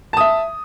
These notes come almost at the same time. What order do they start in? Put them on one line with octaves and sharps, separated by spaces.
A5 D#6 E5